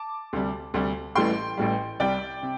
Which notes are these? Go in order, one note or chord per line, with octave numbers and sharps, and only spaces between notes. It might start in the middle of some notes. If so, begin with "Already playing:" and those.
Already playing: A5 D6
D2 C3 G3
D2 C3 G3
A1 A2 E3 G3 G5 C6
A1 A2 E3 G3
C2 C3 G3 D5 G5
C3